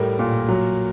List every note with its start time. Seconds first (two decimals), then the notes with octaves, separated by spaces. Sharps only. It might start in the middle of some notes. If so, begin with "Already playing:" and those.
Already playing: A2 G3 A#4
0.19 A#2
0.49 F#3